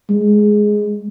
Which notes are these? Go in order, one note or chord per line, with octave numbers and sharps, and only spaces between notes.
G#3